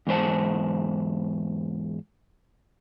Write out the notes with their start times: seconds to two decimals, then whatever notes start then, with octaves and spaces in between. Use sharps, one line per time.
0.07 E2 G#2 D#4 C5 A5